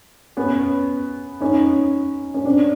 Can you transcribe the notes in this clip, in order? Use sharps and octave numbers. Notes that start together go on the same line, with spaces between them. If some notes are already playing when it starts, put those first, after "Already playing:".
B3 C#4
C#4 D#4
C#4
C4 D4